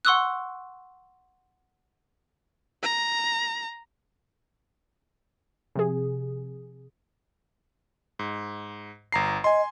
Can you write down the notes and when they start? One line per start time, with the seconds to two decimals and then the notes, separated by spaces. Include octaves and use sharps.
0.05 F#5 C6 C#6 D#6 E6 F#6
2.83 A#5
5.76 C3 F3 G#4
8.19 G#2
9.12 G1 A#5 C7
9.44 D#5 G#5 C6